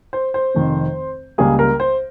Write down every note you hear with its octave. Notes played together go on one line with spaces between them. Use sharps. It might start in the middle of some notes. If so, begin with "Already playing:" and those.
C5
C5
F1 F2 D#3
C#2 C#3 G3 A#3 G#4
A#4
C5